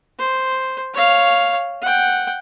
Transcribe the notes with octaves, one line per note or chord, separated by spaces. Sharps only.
C5
C#5 F5
F#5 G5